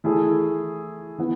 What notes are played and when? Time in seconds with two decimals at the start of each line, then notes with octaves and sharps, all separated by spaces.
0.04 E3 A3 E4 G#4
1.19 E3 B3